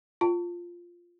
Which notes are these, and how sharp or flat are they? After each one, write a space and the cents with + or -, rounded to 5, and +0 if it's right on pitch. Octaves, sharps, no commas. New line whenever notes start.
F4 +0 A5 +35